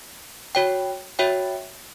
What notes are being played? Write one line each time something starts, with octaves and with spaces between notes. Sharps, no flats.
F#4 C#5 G5
F#4 C#5 E5 G5